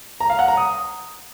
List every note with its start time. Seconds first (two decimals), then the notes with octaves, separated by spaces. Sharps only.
0.20 A#5
0.30 F5
0.39 F#5
0.48 A#5
0.57 D#6